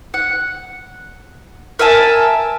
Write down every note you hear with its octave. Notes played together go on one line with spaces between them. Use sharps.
F#5
A#4 E5 G#5 A5